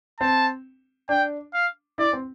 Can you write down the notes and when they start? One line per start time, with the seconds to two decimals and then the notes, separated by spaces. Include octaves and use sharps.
0.20 C4 A5
1.09 D4 G5
1.54 F5
1.98 E4 D5
2.13 C4